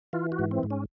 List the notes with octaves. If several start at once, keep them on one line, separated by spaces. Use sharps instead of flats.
E3 F4
F#4
G#2
C4
G#2
C#4